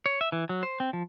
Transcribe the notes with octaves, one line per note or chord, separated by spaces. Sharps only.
C#5
E5
E3
F#3
C5
C4
F3